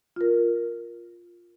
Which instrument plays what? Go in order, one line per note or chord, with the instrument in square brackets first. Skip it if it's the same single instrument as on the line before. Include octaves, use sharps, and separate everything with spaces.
[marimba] F4 A#4